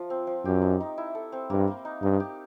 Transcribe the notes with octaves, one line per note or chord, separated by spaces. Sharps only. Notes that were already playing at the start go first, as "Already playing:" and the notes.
Already playing: F3
C4
F3
F#2 G4
D#4
D#4
E4
A4
C4
G2 A#3
A#3
D#4
G2 D#4
G4